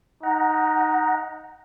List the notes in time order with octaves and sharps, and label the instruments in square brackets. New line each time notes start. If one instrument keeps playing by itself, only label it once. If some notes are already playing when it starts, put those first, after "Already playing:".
[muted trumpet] D#4 [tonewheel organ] F#5 A#5